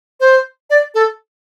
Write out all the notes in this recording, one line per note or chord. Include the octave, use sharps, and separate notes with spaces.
C5
D5
A4